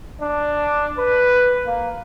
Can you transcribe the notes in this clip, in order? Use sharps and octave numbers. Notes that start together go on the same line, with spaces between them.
D4
B4
A#3